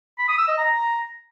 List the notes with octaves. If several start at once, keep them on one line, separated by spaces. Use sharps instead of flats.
B5
D#6
E6
D#5
A#5